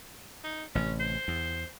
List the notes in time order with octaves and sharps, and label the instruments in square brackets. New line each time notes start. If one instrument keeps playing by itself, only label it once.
[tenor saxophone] D#4
[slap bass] A1 C3 [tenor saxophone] C#4
[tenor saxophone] C5
[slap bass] E2